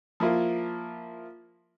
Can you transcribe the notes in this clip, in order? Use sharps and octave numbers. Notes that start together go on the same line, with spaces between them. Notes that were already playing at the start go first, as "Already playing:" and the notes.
F3 A#3 E4 F4